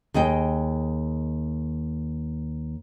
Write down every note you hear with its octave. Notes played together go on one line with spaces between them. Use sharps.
D#2 G#4 D#5 G5